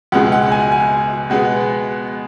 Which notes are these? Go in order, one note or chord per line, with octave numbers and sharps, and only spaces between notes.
C#2 B2 G#3 F#5
F#5
G#5
G#5
B2 G#3 B3 F#5